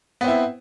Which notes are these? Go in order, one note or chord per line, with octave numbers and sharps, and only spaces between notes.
B3 C4 E4